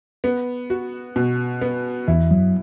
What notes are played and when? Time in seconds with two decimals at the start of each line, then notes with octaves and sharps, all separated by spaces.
0.24 B3
0.70 F#4
1.16 B2
1.61 B3
2.08 E2 E3 E4
2.31 F#2 F#3